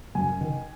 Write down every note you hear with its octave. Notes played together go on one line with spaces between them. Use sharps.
F#2 G#5
D#3